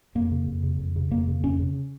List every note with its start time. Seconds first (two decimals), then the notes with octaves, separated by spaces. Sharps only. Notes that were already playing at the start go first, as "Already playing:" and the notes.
0.15 F2 A#3
0.32 C#3
0.48 F2
0.63 C#3
0.79 F2
0.96 C#3
1.11 F2 A#3
1.28 C#3
1.43 F2 C#4
1.59 C#3